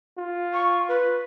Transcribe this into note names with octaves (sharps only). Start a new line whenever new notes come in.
F4
C#6
B4